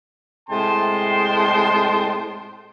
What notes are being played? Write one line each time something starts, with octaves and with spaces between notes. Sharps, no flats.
A2 C3 G#3 G5 A5 C6